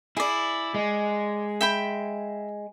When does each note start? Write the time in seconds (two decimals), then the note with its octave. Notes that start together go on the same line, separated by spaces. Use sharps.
0.17 E4 G#4 D5
0.74 G#3
1.61 E5 G5 B5